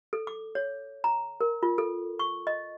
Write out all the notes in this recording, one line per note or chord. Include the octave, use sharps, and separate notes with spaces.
A4
D6
C#5
A#5
A#4
F4
A4
C#6
D#5